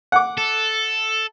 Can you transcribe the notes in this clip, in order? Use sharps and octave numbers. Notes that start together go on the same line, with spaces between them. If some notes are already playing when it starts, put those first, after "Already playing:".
F#5 D6
A4